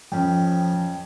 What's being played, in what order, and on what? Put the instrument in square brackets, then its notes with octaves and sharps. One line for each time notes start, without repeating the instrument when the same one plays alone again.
[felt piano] F2 C#4 [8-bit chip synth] F3 [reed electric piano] G5